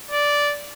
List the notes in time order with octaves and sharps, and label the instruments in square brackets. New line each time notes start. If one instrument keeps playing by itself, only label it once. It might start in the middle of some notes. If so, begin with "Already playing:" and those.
[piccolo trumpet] D5